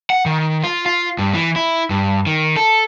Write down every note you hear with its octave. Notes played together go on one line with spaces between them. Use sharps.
F#5
D#3
F4
F4
G2
E3
E4
G2
D#3
A4